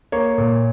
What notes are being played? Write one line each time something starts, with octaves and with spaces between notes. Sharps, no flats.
A#3 C#5
A#2